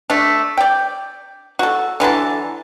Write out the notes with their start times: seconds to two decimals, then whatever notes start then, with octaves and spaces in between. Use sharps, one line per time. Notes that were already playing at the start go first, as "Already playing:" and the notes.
0.10 A3 D4
0.57 D5 G5
1.59 F#4 A4
2.00 D3 E3 F#3 A5